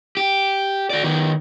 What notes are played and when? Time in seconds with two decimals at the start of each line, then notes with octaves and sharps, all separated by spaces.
0.17 G4
0.90 F#4 D5
1.04 D#3 B3